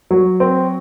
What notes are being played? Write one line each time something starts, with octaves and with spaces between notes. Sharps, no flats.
F#3
C4